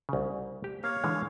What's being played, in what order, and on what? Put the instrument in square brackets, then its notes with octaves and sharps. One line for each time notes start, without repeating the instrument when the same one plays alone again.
[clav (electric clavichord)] C2 C#3
G4
[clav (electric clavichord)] A#3 [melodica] C#5 F5
[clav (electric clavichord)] D3 E3 G#3